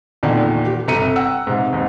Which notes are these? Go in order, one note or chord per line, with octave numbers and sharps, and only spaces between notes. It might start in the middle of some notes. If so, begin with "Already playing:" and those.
E2 A#2 D3 D#3
G4
G1 C3 A#5 C#7 D#7
F#5 G5 E6
G#2 C3
D#2 G#2